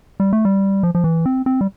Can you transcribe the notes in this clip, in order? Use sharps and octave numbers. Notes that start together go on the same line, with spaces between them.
G3
A3
G3
F3
F3
E3
C4
C4
G3